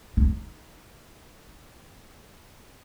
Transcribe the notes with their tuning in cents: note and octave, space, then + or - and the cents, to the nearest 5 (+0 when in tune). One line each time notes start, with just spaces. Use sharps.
D#4 +5